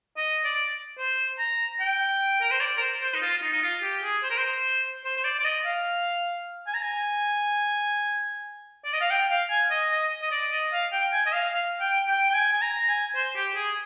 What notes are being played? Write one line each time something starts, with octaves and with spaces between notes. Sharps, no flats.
D#5
D5
C5
A#5
G5
A#4
C5
D5
A#4
C5
C5
D#4
F4
F4
D#4
D#4
F4
G4
G#4
C5
A#4
C5
C5
C5
D5
D5
D#5
F5
G#5
A#5
G#5
D5
D#5
F5
G5
F5
G#5
D#5
D#5
D#5
D5
D#5
F5
G5
G#5
D#5
F5
F5
G5
G5
G5
G#5
G#5
A#5
G#5
C5
G4
G#4